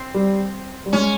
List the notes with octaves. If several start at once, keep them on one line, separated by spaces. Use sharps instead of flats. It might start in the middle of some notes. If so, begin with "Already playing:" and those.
Already playing: C4
G3
G3
G#3 C#4